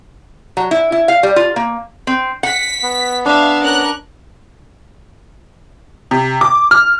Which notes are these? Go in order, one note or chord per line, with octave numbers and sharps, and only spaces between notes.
F#3
E4
E4
F5
G3
F4
A#3
C4
F#5 B6
B3
D4 E5 F5
C#4 A#4 F#6
C3
D6
F6